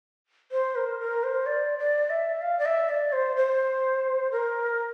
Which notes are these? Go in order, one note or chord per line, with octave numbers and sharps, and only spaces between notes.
C5
A#4
A#4
C5
D5
D5
E5
F5
D5
E5
D5
C5
C5
A#4